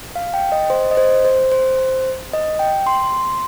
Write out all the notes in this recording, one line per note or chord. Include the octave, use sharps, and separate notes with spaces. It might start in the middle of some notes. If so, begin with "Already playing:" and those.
F5
G5
D#5
C5
D#5
C5
C5
C5
D#5
G5
C6